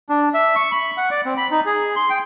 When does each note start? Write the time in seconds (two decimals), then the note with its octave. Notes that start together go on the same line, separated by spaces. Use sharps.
0.09 D4
0.34 E5
0.56 C#6
0.71 B5
0.97 F#5
1.11 D5
1.25 C4
1.37 B5
1.51 D#4
1.66 G#4
1.96 C6
2.10 G5